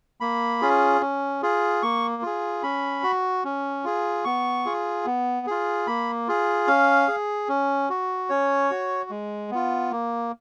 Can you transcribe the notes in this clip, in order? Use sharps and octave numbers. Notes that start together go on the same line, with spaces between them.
A#3 B5
C#4 F4 G#4
C#4
F4 G#4
A#3 C#6
F4 G#4
C#4 B5
F#4
C#4
F4 G#4
B3 C#6
F4 G#4
B3
F4 G#4
A#3 B5
F4 G#4
C#4 F5
G#4
C#4
F#4
C#4 C#5
F#4
G#3
B3 F4
A#3